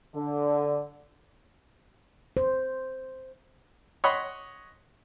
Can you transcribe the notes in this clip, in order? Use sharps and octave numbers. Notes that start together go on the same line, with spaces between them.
D3
C5
C#5 D#5 F#5 B5 C6 D#6